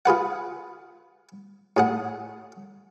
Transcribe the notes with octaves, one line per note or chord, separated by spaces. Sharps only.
F4 G#4 B4 F#5
A2 G#4 F#5